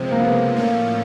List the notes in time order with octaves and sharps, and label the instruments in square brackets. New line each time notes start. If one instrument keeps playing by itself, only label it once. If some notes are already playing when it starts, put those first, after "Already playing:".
Already playing: [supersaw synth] C3 F3 G#3 [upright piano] C4
[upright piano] A#3
B3
[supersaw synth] A2 F3 A3 C#4 [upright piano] A#3